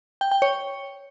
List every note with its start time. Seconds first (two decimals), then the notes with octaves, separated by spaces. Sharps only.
0.21 G5
0.31 G5
0.42 C#5